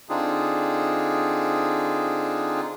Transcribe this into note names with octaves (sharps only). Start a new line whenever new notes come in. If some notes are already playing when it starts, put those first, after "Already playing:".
D3 C4 D4 D#4 F4 G#4